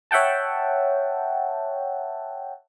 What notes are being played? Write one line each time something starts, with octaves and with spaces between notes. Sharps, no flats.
C#5 E5 F#5 G5 A5